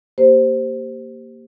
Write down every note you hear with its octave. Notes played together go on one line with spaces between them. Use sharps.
A#3 G4 C5